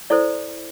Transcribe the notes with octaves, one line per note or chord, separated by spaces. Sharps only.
E4 A4 C5 D5